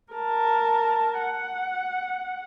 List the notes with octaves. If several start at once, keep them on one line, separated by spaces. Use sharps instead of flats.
A#4 A5
F#5